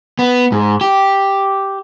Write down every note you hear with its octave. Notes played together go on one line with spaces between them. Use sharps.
B3
G#2
G4